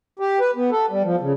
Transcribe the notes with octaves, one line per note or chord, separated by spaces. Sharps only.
G4
B4
B3
A4
G3
F3
C#3